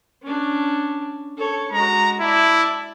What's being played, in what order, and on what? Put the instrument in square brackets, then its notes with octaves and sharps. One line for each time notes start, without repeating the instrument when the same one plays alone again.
[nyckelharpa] C#4 D4
A4 C#5
[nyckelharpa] G#3 F#4 [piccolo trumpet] A#5
[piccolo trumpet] E4 [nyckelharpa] D5 A5